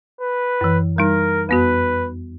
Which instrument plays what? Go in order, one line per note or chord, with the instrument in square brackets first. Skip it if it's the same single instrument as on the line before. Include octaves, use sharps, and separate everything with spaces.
[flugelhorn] B4
[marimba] F#2 E3
[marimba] G3 D#4 [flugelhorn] A#4
[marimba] F2 B3 F#4 [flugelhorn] B4